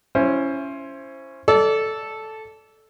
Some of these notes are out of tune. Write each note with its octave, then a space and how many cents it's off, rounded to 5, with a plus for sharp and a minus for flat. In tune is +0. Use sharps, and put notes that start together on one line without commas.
C#4 +0 E4 +25 C5 +20
A4 -5 D5 -25